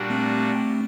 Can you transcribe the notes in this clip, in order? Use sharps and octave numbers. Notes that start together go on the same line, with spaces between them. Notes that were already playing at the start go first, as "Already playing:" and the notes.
Already playing: A#2 G3 D4 F#4
A3 C4